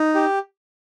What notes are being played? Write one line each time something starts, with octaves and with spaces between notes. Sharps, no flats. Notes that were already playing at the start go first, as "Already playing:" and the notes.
Already playing: D#4
G4